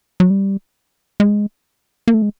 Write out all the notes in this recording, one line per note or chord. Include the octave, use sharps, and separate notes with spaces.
F#3
G3
G#3
A#3
A3
G#3